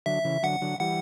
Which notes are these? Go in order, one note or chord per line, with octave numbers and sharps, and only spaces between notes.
D3 F#3 E5
C#3 E3
D3 F#3 F#5
D3 F#3
E3 G3 F#5